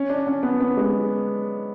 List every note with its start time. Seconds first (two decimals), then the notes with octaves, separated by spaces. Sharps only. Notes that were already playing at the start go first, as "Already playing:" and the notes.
Already playing: C#4
0.10 D4
0.27 C#4
0.43 B3
0.61 B3
0.77 G#3